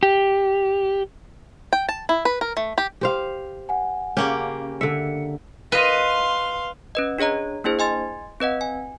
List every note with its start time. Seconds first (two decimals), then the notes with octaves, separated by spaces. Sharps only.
0.03 G4
1.73 G5
1.89 A5
2.09 E4
2.25 B4
2.41 A#4
2.57 A3
2.78 G4
3.01 G4 C5 F5
3.69 F#5 G#5
4.17 C#3 A#3 C#4 G4
4.81 D3 E5 C#7
5.72 B4 D#5 F5 C6
6.95 C#4 B4 D#5
7.19 D4 G#4 C#5 D#5 A#5
7.64 A#3 D4 E4 G#4 C5
7.79 D#5 G#5 C6 A6
8.40 C4 B4 D#5 F#5
8.61 G#5